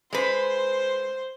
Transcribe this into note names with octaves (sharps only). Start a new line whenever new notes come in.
G#3 B4 C5